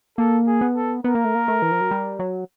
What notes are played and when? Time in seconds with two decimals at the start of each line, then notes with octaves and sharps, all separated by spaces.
0.18 A#3 A4
0.47 G#4
0.61 B3
0.76 A4
1.04 B3 A#4
1.15 A#3
1.25 A3
1.35 A#3
1.48 A3
1.62 E3
1.72 F3
1.81 F#3
1.91 G3
2.19 F#3